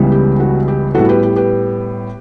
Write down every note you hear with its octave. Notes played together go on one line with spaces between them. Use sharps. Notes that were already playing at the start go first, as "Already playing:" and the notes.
Already playing: C#2 C#3 E3 G3 B3
G4
F#4
G4
A2 G3 B3 F#4 A4
G4 B4
G4
G4 B4